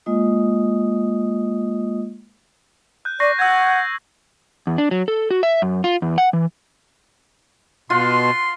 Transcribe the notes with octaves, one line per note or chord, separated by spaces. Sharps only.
G#3 A#3 F4 D#5 D#6
F#6 G6
D5 C#6 A#6 C7
F#5 E6 G6 G#6
E2
D4
F#3
A4
F#4
E5
F#2
F4
E2
F#5
E3
B2 F4 F#5 C6